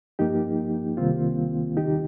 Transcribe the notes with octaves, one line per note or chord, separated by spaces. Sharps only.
G2 F3 A#3 D#4 G4
C2 C3 D#3 G3 A#3 C4 F4
D#2 D#3 G3 D#4 G4